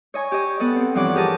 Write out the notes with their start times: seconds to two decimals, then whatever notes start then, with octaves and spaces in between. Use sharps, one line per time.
0.14 C#5 D#5 G#5 C#6
0.32 G4 D#5
0.59 B3 A4 D#5 F#5
0.76 C4
0.95 G2 E3 F3 C#5 F#5 D6
1.15 G4 G#4 A#4 D#5 A5